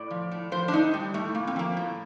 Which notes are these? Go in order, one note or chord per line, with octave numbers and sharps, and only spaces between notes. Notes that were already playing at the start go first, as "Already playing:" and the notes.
Already playing: A2 D5
F3
A2
F3 C5
D4
A2 D#4
A2 G3
A2 A3
A2 A#3
C4
F3 A#3
A2